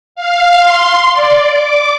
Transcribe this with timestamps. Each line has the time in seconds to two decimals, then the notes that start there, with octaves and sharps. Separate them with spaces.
0.15 F5
0.60 C6
1.13 D5
1.47 D6